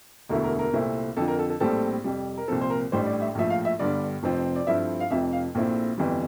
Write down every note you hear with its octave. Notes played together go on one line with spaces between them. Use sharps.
E1 D2 D3 A3 E4 A#4
A#4
A#4
C2 A#2 A3 C4 E4
F2 D3 F3 A4
A#4
A4
A4
A#1 A2 G3 C4 A4
F2 C3 G3
A#4
C2 A#2 F3 C4 A4
C5
A#4
A1 A2 G3 D4 C5
D5
E5
A#1 A2 F3 E5
F5
E5
G1 G2 D3 G3 D5
F1 F2 C3 F3 C4
D5
G2 F3 A3 C4 E4 E5
F5
F1 F2 C3 F3 E5
F5
A#1 A#2 A3 C4 E4
G1 F2 E3 G3